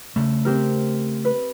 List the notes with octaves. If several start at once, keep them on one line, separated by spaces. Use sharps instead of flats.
C#3 A3
C4 G4 A#4
B4